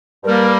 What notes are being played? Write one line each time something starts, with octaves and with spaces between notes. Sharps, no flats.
G2 G3 A#3 A#4